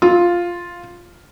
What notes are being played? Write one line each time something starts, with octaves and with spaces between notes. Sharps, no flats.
F4